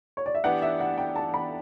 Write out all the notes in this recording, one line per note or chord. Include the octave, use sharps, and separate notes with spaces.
C#5
D5
E5
E3 B3 D4 G4 D5 F#5
E5
F#5
G5
A5
B5